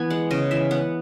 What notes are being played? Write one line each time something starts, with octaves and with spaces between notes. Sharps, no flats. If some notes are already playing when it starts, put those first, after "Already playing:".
Already playing: E3 B3 G#5
G#3 F#5
C#3 D#5
E3 E5
B3 F#5